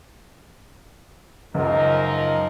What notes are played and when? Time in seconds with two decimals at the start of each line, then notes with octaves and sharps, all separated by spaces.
1.54 C#2 F#2 F3 D#4 A#4